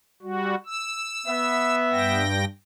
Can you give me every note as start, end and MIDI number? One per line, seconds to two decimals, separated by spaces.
0.22 0.55 55
0.22 0.55 66
0.66 1.75 88
1.27 2.23 59
1.27 2.23 76
1.92 2.45 43
1.92 2.45 79
1.92 2.45 94